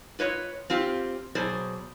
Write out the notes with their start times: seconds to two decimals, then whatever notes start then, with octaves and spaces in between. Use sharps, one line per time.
0.19 F4 B4 C#5 D#5
0.70 C4 F4 G4
1.35 B2 F#3 G#4 C5 D5